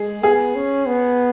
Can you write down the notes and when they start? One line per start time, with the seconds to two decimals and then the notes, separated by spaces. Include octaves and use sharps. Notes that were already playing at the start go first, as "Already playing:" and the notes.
Already playing: G#3 G#4
0.23 B3 G#4
0.56 C#4
0.86 B3